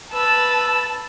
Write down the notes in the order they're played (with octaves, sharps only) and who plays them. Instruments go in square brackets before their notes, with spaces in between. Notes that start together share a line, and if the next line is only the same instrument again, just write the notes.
[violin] B4 E6 [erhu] A5